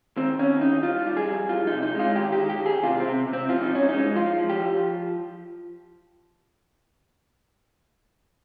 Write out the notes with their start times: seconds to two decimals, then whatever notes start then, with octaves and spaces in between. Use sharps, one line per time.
0.17 D#3 C4
0.39 D#3 C#4
0.61 D#2 D#4
0.83 G3 F4
1.06 G3
1.17 G#4
1.28 F2
1.49 F2 F4
1.67 C3 D#4
1.83 D#4
1.94 G#3
1.99 F4
2.16 D#3 G4
2.32 G4
2.38 D#3
2.49 G4
2.60 D#2
2.66 G#4
2.83 C3 F4
3.00 C4
3.06 C3
3.27 C3
3.33 C4
3.49 F3 F4
3.63 D#4
3.72 G2 C#4
3.89 G#3 D#4
4.15 F3 F4
4.38 F3
4.49 G4
4.59 F3